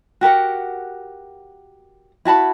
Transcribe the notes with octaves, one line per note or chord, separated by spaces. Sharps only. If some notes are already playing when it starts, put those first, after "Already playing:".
F#4 G4 A#4 F#5
E4 F#4 A5 B5